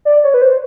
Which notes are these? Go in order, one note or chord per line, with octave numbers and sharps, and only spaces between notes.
D5
C#5
B4
C5